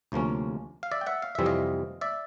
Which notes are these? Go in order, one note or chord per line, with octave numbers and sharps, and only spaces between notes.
D2 C3 F3 A#3 C#4
F5
D5 E5
G5
E5 F#5
F5
F2 C3 E3 G3 C4 E5
D#5 F5
D5 E5